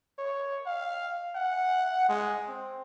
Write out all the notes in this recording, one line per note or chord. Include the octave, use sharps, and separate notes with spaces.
C#5
F5
F#5
G#3
C4